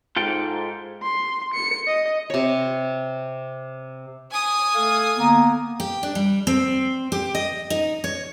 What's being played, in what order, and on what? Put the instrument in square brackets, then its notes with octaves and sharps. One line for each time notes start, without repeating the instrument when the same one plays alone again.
[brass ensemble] G#2 [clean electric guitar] F4 A4 G5
[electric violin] C6
C#7
D#5
[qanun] C3 C#5
[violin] G#5 D#6
[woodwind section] A3 A4 F5
[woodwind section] D3 B3 [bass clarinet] A#3
[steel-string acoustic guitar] G4
D4
G3
C4
G4
D#5
D#4
C#5